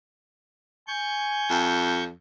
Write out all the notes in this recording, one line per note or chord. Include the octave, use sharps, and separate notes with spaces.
G#5 C#6 G6
F2